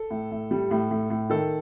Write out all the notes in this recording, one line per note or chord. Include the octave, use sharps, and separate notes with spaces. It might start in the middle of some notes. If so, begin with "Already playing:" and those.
Already playing: A4
A2
A2
G3
A2
A2
A2
D#3 A4